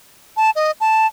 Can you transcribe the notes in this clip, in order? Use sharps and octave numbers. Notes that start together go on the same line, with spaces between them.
A5
D#5
A5